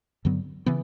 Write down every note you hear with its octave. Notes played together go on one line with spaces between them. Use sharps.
G2 D3 F#3 B3
C#3 E3 B3